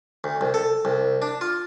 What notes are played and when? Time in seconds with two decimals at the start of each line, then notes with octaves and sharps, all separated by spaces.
0.24 D2
0.41 C2
0.54 A4
0.85 C2
1.22 D4
1.41 F4